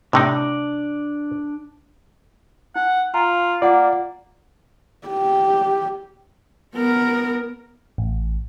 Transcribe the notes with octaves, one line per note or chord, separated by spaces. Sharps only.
A2 C3 D4 D#4 D5
D#4 F#5
F4 F5 G#5 A#5
A#3 F4 D5 F#5 D6
G4
B3 A#4
A1